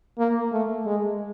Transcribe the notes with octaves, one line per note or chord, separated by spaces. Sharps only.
A#3
A3
G#3